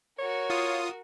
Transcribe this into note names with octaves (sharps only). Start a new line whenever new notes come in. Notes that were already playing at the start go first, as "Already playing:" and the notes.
F#4 A#4 C#5
F4 D#6